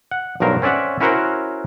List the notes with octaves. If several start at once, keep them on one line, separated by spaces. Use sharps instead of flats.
F#5
B1 G2 F#3 A#4 C5
C4 C#4 D5 E5 F#5
C#4 E4 F#4 A#4 C5 F#5